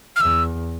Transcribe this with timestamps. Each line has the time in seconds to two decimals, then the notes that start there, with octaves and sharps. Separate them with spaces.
0.16 F6
0.20 E2 E6